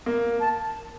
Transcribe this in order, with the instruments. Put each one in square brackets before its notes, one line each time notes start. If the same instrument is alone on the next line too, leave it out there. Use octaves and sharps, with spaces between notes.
[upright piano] A#3
[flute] A5